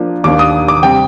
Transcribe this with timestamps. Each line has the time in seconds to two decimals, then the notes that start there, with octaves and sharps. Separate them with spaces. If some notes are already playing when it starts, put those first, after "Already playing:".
Already playing: F3 A#3 D4
0.24 D#2 D#3 A#3 D4 D6
0.39 D#6
0.68 D6
0.83 C3 G3 C4 G5